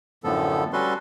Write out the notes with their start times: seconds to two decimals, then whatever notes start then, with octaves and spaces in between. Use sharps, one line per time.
0.24 F#2 A2 D3 F3 B3 A4
0.73 G3 C#4 F#4 A4 B4 C6